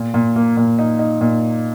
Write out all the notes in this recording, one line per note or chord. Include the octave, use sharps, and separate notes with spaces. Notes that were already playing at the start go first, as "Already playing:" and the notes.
Already playing: A#2
A#2
A#3
A#2
D#4
D#4
A#2